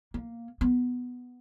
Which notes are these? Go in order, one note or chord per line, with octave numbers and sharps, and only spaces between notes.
A#3
B3